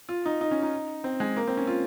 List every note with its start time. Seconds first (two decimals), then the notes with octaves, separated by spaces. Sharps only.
0.09 F4
0.26 D#4
0.41 D#4
0.51 C#4
0.63 D#4
1.04 C4
1.20 G#3
1.37 A#3
1.47 C4
1.57 C#4
1.67 F4